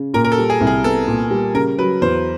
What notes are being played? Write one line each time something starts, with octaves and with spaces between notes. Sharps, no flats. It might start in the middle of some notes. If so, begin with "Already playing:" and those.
Already playing: C#3
A#2 A#4
A#4
A4
G3
G#4
C2
G#4
B3 A4
A#2
G3
C#3 A#4
F#3 B4
E2 C5